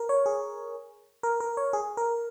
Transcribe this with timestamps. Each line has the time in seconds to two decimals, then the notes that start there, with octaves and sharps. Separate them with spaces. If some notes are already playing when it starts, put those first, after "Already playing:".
Already playing: A#4
0.09 C#5
0.26 G#4
1.23 A#4
1.40 A#4
1.57 C#5
1.73 G#4
1.97 A#4